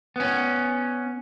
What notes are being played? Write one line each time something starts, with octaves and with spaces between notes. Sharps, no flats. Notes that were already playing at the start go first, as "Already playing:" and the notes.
B3 C#4